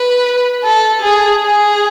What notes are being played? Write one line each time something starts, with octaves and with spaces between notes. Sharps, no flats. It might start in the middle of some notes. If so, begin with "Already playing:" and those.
Already playing: B4
A4
G#4
G#4